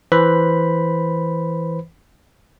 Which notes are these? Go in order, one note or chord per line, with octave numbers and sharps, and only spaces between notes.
E3 B4 C5 B5